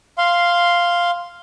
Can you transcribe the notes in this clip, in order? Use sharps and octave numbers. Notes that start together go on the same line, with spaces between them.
F5 C6